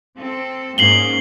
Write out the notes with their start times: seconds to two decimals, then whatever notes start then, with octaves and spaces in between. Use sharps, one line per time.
0.17 C4 A4
0.78 G#2 A#3 C#4 C7 F#7 G7